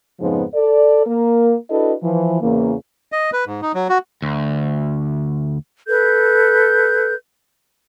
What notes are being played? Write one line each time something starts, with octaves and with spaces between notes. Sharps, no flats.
F2 G#2 C#3 F3 B3 D#4
A4 D5
A#3 A#4
D4 E4 F#4 A4 B4 D#5
E3 F3
E2 C#3 E3 A#3
D#5
B4
G#2
D#4
F#3
F#4
D2
A4 B4 G6